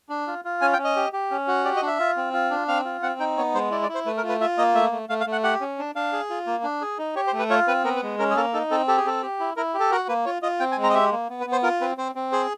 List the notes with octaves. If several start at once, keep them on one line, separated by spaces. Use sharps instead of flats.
D4
F4
F4
C#4 G#5
G5
C#4
D#5
G4
G4
C#4
F#4
G4 D5
D#5
D4 E5
F4
C4
F4
D4
C4 F5
F4
C4 F#5
D#4 G5
B3 C#5
G#3 C5
E4 D5
D5
E4
C5
A3 B4
A#4
F4
B4
F4 E5
A#3 D#5
A3 E5
A3
A3 F5
F5
A3
F#5
G4 F#5
C#4
D4
D4 F5
G#4
F4
A#3
D4
G#4
D#4
G4 C#5
C5
A3
B4
F4 C#5
C4 B4
B3 A#4
B4
G#3
C#4 A#4
G#4
A#3 A4
D#4 A4
C4 A4
G4 A4
G#4
C4 A4
G4
E4
E4 A#4
G4
A4
F#4 A#4
A#3 B4
F4 C#5
F4 D#5
C4 G5
G#5
G#3
A#5
D#5
G4 E5
A#3
B3
B4
B3
C5
F4 A#4
C4 B4
C4 C5
C4
G#4 C5